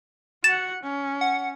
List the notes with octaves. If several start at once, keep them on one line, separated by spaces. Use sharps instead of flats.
F#4 F#5 A6 E7
C#4
F#5